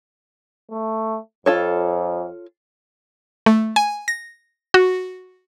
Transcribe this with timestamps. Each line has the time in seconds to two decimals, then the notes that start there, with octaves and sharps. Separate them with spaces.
0.71 A3
1.46 F2 F4 A4 C#5
3.46 A3
3.76 G#5
4.08 A#6
4.74 F#4